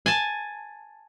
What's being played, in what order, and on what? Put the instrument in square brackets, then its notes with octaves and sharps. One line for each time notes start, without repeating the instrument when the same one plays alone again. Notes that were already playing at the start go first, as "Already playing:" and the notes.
[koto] G#5 A5